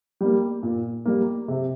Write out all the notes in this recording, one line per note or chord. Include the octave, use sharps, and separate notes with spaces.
G3 A#3
A#2
G3 A#3
C3